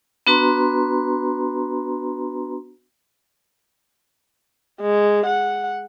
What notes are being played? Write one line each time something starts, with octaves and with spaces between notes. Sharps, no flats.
B3 D4 F#4 B4 A#5 C6
G#3
F#5